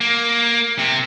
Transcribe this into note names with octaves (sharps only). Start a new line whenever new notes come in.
A#3
C3